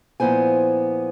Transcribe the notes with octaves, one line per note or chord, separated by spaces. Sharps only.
A#2 F3 B3 E4 C5 G#5